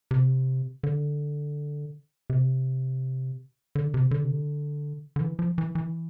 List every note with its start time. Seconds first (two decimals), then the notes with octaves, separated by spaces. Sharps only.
0.11 C3
0.83 D3
2.30 C3
3.75 D3
3.94 C3
4.11 D3
4.24 C3
4.30 D3
5.16 D3
5.20 E3
5.39 F3
5.58 E3
5.75 E3